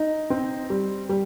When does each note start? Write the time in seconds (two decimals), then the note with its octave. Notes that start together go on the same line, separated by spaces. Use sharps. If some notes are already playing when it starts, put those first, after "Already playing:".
Already playing: D#4
0.30 C4
0.70 G3
1.09 G3